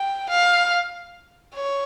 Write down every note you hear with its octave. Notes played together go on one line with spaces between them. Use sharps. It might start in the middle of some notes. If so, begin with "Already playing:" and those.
Already playing: G5
F5
C#5